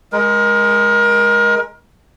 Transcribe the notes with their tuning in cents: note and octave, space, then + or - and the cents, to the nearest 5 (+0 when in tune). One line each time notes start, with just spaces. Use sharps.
G#3 +0 A#4 +30